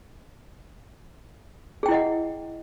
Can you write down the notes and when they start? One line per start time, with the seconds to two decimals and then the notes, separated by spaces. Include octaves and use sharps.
1.83 G#4
1.86 G5
1.88 E4
1.91 D#5
1.94 F#5